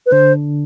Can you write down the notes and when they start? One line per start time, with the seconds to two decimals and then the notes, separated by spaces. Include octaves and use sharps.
0.06 B4
0.12 D3 D4 C5